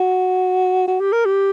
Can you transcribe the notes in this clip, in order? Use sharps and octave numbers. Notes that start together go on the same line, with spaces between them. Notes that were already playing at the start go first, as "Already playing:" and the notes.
Already playing: F#4
F#4
G4
A#4
G4